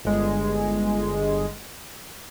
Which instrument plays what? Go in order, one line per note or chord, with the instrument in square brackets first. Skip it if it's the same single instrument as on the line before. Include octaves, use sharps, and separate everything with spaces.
[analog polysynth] G1 G#3